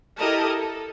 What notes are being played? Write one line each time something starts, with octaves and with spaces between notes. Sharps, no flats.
E4 G4 A4 A#4 D#5 A5
A4